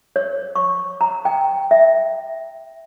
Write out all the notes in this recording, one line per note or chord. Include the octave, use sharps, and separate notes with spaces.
C#5
C#6
A#5
G5
E5